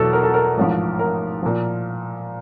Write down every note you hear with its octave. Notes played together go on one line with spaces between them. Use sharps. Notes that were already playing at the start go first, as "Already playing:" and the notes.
Already playing: E2 B2 F#3 E4 A4
A#4
A4
A#4
A1 G#2 F3
A#4
A#2 F3